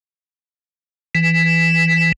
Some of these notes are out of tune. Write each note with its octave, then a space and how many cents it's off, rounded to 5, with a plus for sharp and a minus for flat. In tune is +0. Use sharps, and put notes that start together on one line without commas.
E3 +5